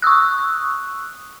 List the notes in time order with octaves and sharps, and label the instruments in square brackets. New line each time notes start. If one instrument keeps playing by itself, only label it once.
[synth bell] C#6 D#6 E6 F#6